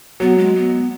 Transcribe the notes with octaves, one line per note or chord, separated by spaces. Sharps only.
F#3 B3
G#3
B3